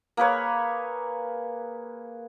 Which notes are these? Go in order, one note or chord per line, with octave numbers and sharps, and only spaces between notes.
A#3 G#4 B4 C#5